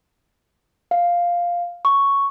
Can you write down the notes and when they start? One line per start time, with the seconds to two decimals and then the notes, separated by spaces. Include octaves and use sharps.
0.91 F5
1.85 C#6